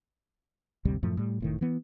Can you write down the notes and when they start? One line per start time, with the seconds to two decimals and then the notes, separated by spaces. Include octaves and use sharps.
0.85 G#1 D2 C3 G3
1.03 F#2 A2 F3 A3
1.17 A2 G3
1.40 F1 A2 D#3
1.61 E3 B3